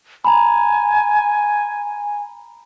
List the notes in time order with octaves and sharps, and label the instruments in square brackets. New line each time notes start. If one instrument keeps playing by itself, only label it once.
[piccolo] G#5 [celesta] A#5 B5